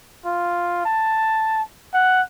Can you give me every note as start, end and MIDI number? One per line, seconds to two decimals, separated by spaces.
0.26 0.85 65
0.85 1.62 81
1.94 2.21 78